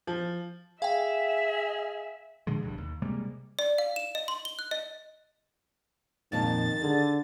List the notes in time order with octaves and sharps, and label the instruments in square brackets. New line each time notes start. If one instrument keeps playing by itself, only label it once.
[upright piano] F3
[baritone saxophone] G#4 [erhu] E5 [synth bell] F5 G5
[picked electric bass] A2 D3 F3 G#3
E1 B1 G2
D#2
C3 G3 G#3 A#3
[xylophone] D5
F5
E7
D#5
C6
G7
F#6
D#5
[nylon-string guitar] F2 A#2 A5 [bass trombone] D#3 [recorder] A6
[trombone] D3 [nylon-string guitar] G#4